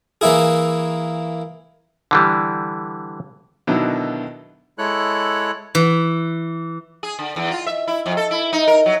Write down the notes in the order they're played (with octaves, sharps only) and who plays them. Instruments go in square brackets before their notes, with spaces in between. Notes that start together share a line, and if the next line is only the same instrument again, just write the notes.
[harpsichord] E3 A#3 E4 G#4
[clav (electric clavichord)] D3 E3 G3
[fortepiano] B2 D3 D#3 F#3 D#4 E4
[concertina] G#3 E4 A4 C#5 F#6
[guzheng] E3
[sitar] G#4
D3
E2
F4
E5
E4
F2
A4
E4
D#4
A#4
F#3